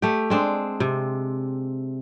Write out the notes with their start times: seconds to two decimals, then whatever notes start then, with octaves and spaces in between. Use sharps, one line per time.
0.02 A3 G4
0.30 G#3 C4 D4
0.80 C3